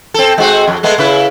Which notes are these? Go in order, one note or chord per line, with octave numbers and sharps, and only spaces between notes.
C4 A4
G#3 C4 F#4
F2
G#3 A3 B3
C#3 E4 B4